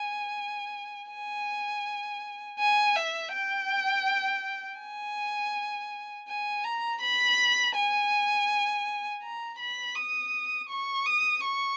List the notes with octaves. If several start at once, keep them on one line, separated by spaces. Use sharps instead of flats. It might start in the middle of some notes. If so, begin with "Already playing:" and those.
Already playing: G#5
G#5
G#5
E5
G5
G#5
G#5
A#5
B5
G#5
A#5
B5
D#6
C#6
D#6
C#6